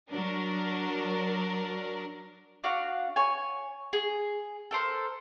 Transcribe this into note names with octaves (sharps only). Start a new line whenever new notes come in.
F#3 D4 A#4
D4 F#4 F5
C#5 G#5
G#4
A4 A#4 C5